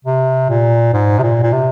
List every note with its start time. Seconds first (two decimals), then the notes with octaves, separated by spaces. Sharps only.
0.05 C3
0.49 A#2
0.93 G#2
1.19 C3
1.23 A#2
1.43 A#2
1.52 C3